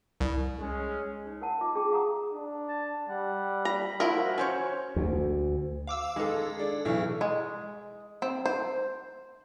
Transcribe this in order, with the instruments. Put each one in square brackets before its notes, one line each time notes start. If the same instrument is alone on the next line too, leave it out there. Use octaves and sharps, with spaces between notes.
[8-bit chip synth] C2
[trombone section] G#3 C#4
[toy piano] D#4 C#5
E4 A#4 F#5 A5
F4 D#5 D6
D4 G#4 G5 A5 D6
G#4 F5 F#5 A#5 D#6
[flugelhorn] D4
[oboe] A5
[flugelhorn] G3 [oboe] F#5
[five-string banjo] A#5 [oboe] B5
[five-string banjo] F3 E4 A#4 [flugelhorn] F#4
[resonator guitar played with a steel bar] C#4 C5 C#5
[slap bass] D2
[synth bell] F5 D6 E6
[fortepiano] D#3 G#3 [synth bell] G#4 A4
[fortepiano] D4
B1 E3 C#6
[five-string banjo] G#3
C4
C5